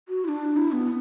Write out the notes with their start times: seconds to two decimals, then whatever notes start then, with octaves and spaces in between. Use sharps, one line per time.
0.09 F#4
0.25 E4
0.28 D4
0.57 E4
0.72 B3